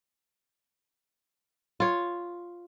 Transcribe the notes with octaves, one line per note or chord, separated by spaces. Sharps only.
F4 C#5